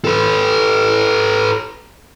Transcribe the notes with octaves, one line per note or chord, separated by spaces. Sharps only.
A4 B4